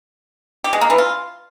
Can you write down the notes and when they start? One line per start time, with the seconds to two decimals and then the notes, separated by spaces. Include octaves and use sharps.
0.64 G4
0.73 G#3
0.81 A#3
0.90 E3
0.98 F4